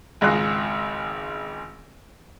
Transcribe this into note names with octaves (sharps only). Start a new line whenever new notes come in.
G#1 C#2 F4 D#5 F#6